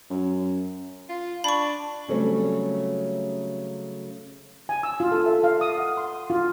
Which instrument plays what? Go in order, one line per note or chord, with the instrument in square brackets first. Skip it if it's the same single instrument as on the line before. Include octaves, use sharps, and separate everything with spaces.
[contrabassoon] F#2
[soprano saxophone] F4
[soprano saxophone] D4 [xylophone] B5 C#6
[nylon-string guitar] C#3 F#3 G3 A3 C4 C#4
[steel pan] G#5
E6
F4
A4
E5
F5
D#6
F#5
C6
F4